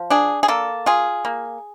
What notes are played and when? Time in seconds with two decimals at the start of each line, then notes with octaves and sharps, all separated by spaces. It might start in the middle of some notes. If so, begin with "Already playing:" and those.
Already playing: F3
0.10 D4 G#4
0.43 G#4
0.48 A#3 A4
0.86 F4 G#4
1.25 A#3